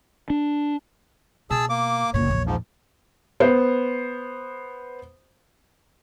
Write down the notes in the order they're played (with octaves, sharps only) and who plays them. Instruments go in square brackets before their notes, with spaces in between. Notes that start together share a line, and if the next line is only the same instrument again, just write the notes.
[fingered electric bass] D4
[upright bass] B2 [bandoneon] G#4 A5 E6
[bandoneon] A#3 D6
[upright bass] F#1 A#2 [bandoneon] C#5
[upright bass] A#1 E2
[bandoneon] G#2 F3
[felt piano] B3 C5